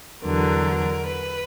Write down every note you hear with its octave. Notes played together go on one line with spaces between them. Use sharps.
E2 D3 F#3 A#4
B4